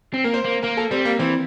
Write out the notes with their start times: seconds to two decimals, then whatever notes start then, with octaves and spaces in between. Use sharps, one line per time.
0.14 C4
0.24 A#3 A#4
0.34 C5
0.44 A#3
0.63 A#3 A#4
0.77 A4
0.91 G3 C4
1.05 A#3
1.19 E3 C4